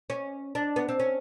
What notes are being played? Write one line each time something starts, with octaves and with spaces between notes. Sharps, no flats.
C#4
D4
B3
C4
C#4